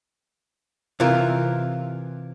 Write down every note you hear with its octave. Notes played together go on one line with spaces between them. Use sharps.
C3 E3 F4 A#4